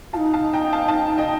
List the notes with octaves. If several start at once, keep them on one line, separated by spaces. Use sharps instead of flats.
D#4 F4 F5 A5
F5 A5
G5 A#5
F5 A5
F5 A5
D#5 G5